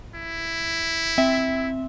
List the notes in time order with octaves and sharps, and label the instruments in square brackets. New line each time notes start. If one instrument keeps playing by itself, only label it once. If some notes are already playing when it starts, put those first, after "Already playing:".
[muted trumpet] E4
[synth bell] C4 E5